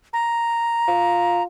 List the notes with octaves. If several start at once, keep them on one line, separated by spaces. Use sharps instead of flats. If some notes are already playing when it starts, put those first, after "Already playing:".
A#5
F4